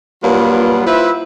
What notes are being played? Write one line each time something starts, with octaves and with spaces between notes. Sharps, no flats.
G2 A#2 F#3 A#3 B3 F4
E4 F4 B4 C5 E5